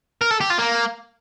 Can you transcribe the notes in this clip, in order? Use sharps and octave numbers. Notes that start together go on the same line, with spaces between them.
A#4
A4
G4
F4
A#3